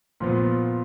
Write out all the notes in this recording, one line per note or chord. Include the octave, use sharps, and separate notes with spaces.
A#2 F3 B3 F4